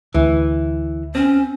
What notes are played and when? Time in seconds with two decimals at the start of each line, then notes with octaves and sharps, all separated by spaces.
0.14 D2 E3
1.15 C4 C#4